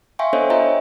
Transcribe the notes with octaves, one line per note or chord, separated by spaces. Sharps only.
E5 F5 G5 G#5 C6 C#6
B3 D4 A4 C5 C#5 D#5
F4 C#5 D#5 E5 G5 A#5